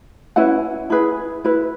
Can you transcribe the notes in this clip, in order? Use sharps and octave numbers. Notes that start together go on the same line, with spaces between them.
C#4 E4 B4 F#5
E4 G#4 B4
E4 B4